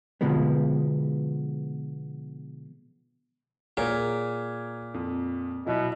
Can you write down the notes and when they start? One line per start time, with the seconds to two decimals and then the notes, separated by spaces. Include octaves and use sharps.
0.21 B2 D3 F3 G#3 B3
3.77 A#2 G#4 A#4 C#5
4.94 F2
5.66 B2 F#3 E4 E5